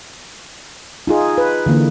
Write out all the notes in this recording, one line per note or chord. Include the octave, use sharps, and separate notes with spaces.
D#4 F4 G#4
B4
D3 E3 A#3